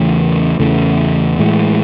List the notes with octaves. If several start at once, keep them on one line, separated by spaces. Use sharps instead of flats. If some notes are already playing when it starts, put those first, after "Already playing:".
Already playing: E2 C#3 E3 A3
E2 C#3 E3 A3
A2 E3 G#3